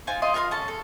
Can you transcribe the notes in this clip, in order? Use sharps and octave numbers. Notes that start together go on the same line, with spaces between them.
D#4 F4 C5 G#5
F4 D#5 C6
F4 A#4 F5 C6
C#4 A4 A5
A4